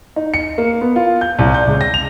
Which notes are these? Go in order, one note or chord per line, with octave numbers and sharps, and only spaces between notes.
D#4
C#7
A#3
B3
F4
G6
C2
G6
C#2
A#6
F7